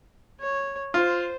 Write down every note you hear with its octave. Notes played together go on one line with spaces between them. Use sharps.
C#5
F4 C5